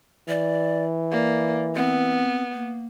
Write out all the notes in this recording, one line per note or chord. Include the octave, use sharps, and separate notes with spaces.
E3 D5
A#3 D5
B3 C4
A#3